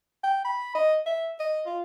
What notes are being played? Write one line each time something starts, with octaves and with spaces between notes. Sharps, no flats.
G5
B5
D#5
E5
D#5
F4